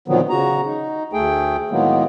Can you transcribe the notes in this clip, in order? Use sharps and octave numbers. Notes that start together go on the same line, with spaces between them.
A#2 D3 D#3 F3 F#3 B3
C#3 F#4 A#5
D#4
D2 A3 G#4 G5
A2 D#3 F#3 G#3 A#3 B3